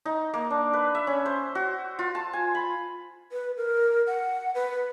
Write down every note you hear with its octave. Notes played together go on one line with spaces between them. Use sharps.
D#4
A#3
D4
B4
E5
C#4
C5
F#4
F4
A5
G#5
B5
B4
A#4
F#5
B4